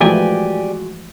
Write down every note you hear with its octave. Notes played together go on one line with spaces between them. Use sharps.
E3 F3 G#3 A3 F#4 G4 D5 G#5